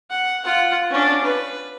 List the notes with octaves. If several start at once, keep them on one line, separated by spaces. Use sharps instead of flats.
F#5
F4 F#5
C#4 D4
B4